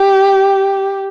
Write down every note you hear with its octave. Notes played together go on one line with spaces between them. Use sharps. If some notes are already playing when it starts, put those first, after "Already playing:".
Already playing: G4